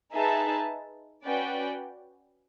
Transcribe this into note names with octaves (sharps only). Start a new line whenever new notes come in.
D#4 G#4 B4 E5 A5
C#4 F#4 B4 D5 G5